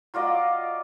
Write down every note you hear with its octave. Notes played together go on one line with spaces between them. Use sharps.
F#3 F4 D5 D#5